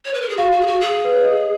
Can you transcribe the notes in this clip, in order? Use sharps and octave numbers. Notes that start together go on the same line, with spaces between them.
C#5
B4
A#4
G#4
F#4 F5
F#4
G#4
F#4
G#4
B4
C#5
D#5